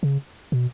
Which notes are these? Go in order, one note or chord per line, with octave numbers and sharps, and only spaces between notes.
C#3
B2